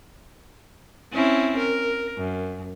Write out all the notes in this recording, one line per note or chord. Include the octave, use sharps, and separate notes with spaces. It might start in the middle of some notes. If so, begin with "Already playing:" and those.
C4 C#4 E4
A#4
F#2